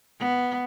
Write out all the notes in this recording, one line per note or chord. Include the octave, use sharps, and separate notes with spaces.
B3